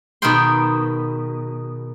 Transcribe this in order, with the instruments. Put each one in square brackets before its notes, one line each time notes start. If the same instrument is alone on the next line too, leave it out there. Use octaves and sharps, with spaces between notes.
[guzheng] B2 D#3 G#4 A#4 G5 C6